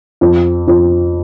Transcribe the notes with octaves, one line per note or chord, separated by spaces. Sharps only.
F2
F2